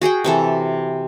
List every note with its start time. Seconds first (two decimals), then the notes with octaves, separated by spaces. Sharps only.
0.02 F#4 G#4 F#5 G5
0.24 C3 E3 A4